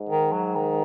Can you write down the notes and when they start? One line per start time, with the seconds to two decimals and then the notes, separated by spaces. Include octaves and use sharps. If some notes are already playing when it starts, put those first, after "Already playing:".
Already playing: G#2
0.09 D#3
0.32 F#3
0.55 D#3